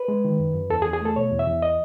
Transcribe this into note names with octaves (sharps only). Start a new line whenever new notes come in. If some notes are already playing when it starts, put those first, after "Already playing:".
Already playing: B4
G#3
D#3
F#2
F#2
E2 A4
G#4
E2
G#4
A3 A4
B2 C#5
E2
E5
E2
D#5